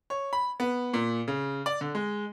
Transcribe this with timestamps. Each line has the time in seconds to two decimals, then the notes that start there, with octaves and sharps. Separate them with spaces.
0.10 C#5
0.33 B5
0.60 B3
0.94 A#2
1.28 C#3
1.66 D5
1.81 D3
1.95 G#3